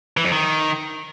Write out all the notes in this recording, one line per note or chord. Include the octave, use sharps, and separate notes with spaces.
E3
F2
D#3